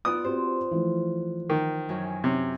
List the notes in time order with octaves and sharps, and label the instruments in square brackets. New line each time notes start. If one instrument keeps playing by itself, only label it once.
[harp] B3 F4 D5 [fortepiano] D#6 [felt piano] F#6
[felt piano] C4 F#4 G4 [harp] C5
[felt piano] E3 F3 A3
[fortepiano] D#3
[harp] F#2 G#5
[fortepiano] C3 [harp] C#4